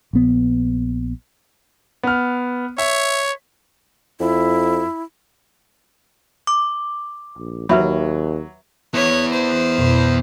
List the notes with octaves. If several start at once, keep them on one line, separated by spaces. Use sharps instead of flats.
A#1 B3
B3 F6
C#5 E5
F2 E4
D6
A#1
D#2 F#3 B4 E5 B5
B3 E4 C#5
C5
F2 B2